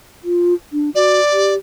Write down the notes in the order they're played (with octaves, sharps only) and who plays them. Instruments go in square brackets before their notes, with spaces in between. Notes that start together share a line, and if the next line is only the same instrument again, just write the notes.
[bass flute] F4
D4
[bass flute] F#4 [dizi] D5
[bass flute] G4